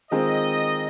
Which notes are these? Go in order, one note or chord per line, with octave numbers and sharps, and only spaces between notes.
D#3 G#3 C4 F4 G#4 D#5